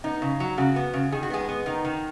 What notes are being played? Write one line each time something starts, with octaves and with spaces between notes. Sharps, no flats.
B3 D#4
C#3
F#3
C#3 F#4
B3
C#3
D#3 G#4
F#4
G#3 B3 G#4
B3
D#3 D#4
D#3